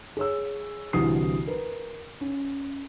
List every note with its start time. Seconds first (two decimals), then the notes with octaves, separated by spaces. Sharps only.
0.17 G#4 C#5 E6
0.93 C2 D3 E3 F#4 D#6 C7
1.47 A#4 B4
2.21 C#4